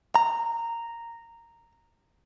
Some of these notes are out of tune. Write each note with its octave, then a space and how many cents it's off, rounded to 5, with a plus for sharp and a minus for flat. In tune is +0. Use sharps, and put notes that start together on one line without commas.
A#5 -10